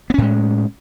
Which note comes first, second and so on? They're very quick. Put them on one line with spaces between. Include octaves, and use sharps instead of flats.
B3 C#4 A2 G#3